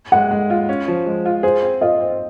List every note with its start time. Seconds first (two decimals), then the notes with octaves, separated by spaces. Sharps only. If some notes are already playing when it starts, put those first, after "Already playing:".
0.12 G#3 F#5
0.31 G#3
0.50 F4
0.69 C#4
0.88 F3
1.06 G#3
1.25 F4
1.43 G#4 C5
1.62 C4
1.81 F4 D#5
2.00 C4